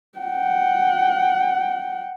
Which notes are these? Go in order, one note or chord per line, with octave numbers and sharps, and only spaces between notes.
F#5 G5